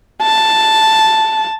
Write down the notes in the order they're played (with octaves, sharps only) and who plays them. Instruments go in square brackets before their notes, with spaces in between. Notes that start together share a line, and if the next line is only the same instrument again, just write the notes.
[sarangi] A5